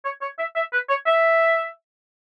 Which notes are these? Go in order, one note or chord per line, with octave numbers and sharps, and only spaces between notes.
C#5
C#5
E5
E5
B4
C#5
E5